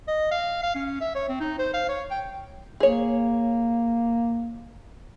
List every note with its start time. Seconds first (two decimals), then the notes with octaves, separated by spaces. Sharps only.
0.08 D#5
0.31 F5
0.63 F5
0.75 C#4
1.01 E5
1.15 C#5
1.29 C4
1.40 D#4
1.59 C5
1.74 F5
1.89 C#5
2.11 G5
2.80 A#3 G#4 C#5